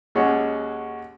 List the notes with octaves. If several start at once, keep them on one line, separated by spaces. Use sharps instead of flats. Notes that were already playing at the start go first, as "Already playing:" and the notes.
D#2 G#3 C#4 F#4